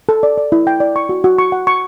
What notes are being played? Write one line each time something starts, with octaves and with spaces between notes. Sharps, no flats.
A4
D5
D5
E4
G5
D5
C#6
F#4
F#4
C#6
F#5
C#6